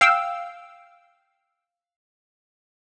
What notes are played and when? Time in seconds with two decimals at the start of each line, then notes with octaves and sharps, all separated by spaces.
0.01 F5 G5 E6